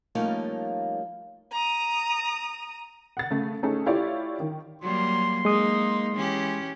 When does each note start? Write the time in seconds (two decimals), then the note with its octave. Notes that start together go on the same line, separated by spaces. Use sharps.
0.15 F3 G3 A3 A#3 C#4 D#4
1.52 A#5 D#6
3.17 F#5 A6
3.31 C#3 A3
3.63 A3 C#4 D#4 G#4 A4
3.86 E4 F4 G4 C#5 D5
4.40 D#3
4.82 F#3 G3 A#3 C6
5.45 G#3 A#3 D#4 D#6
6.14 E3 C#4 G4